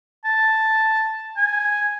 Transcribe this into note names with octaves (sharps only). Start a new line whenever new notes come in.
A5
G#5